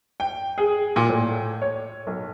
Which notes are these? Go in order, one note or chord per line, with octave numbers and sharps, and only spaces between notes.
G5
G#4
A#2
A2
C#5
B1